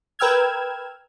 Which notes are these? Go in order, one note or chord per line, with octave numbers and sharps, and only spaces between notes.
A#4 B4 G5 E6 F6 G#6